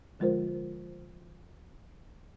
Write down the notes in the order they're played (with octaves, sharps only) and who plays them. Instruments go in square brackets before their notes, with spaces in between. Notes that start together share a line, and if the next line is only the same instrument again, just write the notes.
[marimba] D3 F3 G#3 F4 A#4 C5